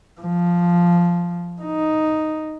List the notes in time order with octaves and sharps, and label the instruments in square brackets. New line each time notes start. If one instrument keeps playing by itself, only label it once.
[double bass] F3
D#4